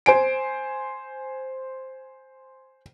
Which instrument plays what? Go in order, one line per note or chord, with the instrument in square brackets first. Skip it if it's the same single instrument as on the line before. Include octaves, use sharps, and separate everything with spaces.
[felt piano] C5 G#5 D7